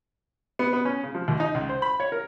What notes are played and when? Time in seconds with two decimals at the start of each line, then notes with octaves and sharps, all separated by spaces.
0.59 B3
0.73 B3
0.85 C#4
1.03 C#3
1.15 F3
1.28 D#2
1.40 D#4
1.54 C#2
1.69 C5
1.82 B5
2.00 C#5
2.12 A#4